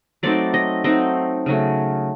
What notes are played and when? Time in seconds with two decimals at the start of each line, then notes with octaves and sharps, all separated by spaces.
0.23 F#3 A3 C4 D#4 D5
0.54 D#5
0.84 F#3 A3 C4 D#4 D#5
1.46 C#3 F#3 A3